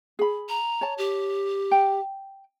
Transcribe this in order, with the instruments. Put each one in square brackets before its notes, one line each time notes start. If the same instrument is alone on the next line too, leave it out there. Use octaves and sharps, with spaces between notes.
[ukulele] G#4 B5
[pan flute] A#5
[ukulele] C#5 A5
[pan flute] G4
[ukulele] G5